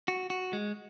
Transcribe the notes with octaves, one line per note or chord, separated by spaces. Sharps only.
F#4
F#4
G#3